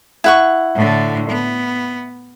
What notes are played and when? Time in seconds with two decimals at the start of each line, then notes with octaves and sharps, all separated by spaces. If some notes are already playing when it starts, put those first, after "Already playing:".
0.24 E4 F#5 C#6
0.75 A2 D3
1.29 B3